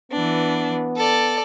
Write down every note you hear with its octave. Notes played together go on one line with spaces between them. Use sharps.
E3 B3 D4
A4 D5